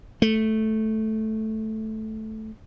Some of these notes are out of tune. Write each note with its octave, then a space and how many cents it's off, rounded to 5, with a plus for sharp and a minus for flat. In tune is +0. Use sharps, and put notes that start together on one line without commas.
A3 -5